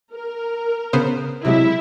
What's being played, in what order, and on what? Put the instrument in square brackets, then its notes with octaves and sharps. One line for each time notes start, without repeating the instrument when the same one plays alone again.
[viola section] A#4
[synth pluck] C#3 B3 C5
[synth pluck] C3 F#3 G#3 [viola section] E4 E5